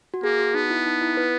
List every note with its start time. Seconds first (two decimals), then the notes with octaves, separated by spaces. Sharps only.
0.14 F#4
0.24 A#3 G#4
0.40 F#4
0.54 B3 D#4
0.70 E4
0.86 D#4
1.01 E4
1.17 B4